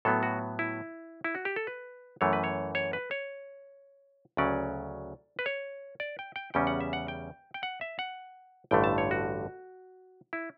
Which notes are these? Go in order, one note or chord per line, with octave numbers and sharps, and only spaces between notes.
A2 F#3 B3 A4
F#4
E4
E4
F#4
G4
A4
B4
F#2 E3 A3 C#5
B4
C#5
C#5
B4
C#5
D2 C#3 F#3 C#4 D5
B4
C#5
D5
G5
G5
E2 C#3 G3 C#4 G5
F#5
E5
F#5
G5
G5
F#5
E5
F#5
A1 G2 D3 A3 G5
A5
C#5
F#4
E4